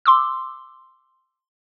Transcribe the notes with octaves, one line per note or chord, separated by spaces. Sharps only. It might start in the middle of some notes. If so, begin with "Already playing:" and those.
C6 D6 E6